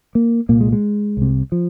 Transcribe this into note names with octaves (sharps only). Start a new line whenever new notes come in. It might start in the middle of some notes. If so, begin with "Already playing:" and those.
A#3
C2 A#2 A#3
G#3
G#3
C2 C3
F3